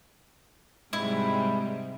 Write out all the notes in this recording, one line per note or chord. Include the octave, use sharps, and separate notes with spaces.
G#2 C3 G3 G#3 E4